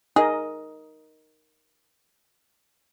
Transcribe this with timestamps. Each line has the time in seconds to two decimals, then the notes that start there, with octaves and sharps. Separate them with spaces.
0.16 D#4 G#4 A#4 D#5